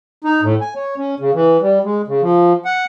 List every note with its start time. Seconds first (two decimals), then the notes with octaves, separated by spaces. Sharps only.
0.24 D#4
0.42 A2
0.61 G#5
0.76 C#5
0.97 C#4
1.20 C#3
1.34 E3
1.61 G3
1.84 G#3
2.08 C#3
2.22 F3
2.65 F#5